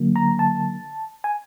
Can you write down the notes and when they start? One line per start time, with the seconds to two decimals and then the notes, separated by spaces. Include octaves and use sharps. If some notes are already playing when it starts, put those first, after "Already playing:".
Already playing: D3 F#3 A#3
0.16 A#5
0.39 A5
1.24 G#5